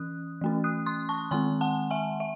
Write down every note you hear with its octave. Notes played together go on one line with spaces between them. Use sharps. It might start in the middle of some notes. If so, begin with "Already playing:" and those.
Already playing: E3 C#4 D#6 F#6
E3 A3 C#4
D#6 F#6
C6 D#6
A5 C#6
D#3 G#3 C4 G#5 C6
F#5 A5
E5 G#5
E5